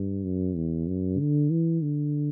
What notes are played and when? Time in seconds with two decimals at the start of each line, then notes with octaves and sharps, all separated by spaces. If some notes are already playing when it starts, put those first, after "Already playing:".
Already playing: G2
0.24 F#2
0.56 E2
0.88 F#2
1.19 D3
1.50 E3
1.82 D3